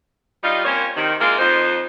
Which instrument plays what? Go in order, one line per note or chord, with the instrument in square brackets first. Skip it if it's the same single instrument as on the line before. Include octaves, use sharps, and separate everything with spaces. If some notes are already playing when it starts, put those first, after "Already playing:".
[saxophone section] G3 D#4 F4
A#3 C4 C#4 A#4 C#5
C3 D#3
G#3 A#3 C4 E4 F4 A#4
F2 D#4 C5